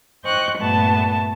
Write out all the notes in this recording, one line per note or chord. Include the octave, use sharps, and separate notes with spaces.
C5 D#5 G5 C#6 F#6
G2 A#2 A3 B3 A5